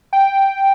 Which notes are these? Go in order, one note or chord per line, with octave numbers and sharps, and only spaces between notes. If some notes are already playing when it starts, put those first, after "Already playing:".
G5